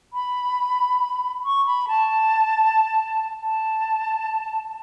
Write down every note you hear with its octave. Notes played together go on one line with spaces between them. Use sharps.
B5
C#6
B5
A5
A5